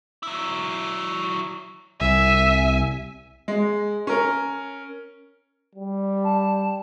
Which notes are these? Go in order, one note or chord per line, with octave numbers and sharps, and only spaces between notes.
F#3 E4
C2 E5 G#5
G#3
C#4 A#4
G3
A5